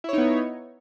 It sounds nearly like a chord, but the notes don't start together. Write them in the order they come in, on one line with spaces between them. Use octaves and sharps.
E4 C#5 D#4 B3